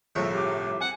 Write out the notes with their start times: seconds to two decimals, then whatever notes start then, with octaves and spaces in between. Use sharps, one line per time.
0.15 G1 C2 A2 F3 G#4 E5 C#6
0.33 G4 D6
0.81 C4 F#5 G#5